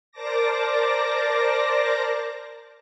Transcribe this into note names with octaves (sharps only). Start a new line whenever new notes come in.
A#4 C5 D5 A5 D6 A#6